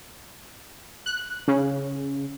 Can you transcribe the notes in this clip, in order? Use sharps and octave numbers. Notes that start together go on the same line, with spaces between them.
F#6
C#3